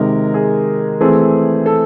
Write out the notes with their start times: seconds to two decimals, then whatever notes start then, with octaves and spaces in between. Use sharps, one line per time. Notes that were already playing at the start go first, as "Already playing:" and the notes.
Already playing: C3 D#3 G#3 A#4
0.34 G#4
1.01 E3 A3 C4 G#4
1.66 A4